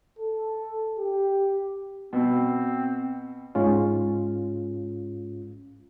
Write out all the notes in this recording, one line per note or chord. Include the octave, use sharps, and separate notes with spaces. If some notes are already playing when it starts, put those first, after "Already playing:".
A4
G4
B2 C4
G#2 G#3 C#4 F4